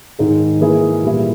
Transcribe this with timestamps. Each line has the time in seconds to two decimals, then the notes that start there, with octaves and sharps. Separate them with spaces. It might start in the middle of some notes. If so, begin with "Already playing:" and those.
0.19 G#2 D#3 G#3 D#4 G#4
0.61 E3 A#3 E4 G#4
1.03 A#2 G3 A#3 E4